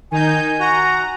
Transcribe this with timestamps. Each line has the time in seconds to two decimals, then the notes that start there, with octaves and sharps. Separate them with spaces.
0.12 D#3 D#4 G#5 G6
0.60 F#4 A#5